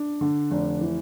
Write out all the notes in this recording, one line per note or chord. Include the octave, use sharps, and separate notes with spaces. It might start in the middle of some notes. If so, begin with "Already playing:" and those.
Already playing: D4
D3
F1
E3